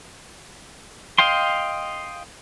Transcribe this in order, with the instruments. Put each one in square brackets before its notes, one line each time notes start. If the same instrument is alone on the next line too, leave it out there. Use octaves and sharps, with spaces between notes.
[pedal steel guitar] D#5 F5 G5 C6